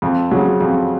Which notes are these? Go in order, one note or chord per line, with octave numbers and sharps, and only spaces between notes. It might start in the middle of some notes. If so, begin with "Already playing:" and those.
F2
C#3 F#3
F2